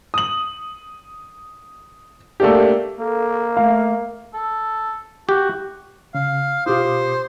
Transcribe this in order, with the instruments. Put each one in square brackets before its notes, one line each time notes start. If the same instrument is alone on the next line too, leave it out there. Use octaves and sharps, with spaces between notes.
[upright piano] D#6 F#7
A3 A#3 D4 G4
[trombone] A#3 [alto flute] A4
[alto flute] A3 [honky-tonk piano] F5
[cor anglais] A4
[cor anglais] F#4 [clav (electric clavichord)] G4
[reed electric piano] C#3 [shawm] F5
[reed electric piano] B2 D6 D#6 [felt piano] F4 G4 F5 [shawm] C5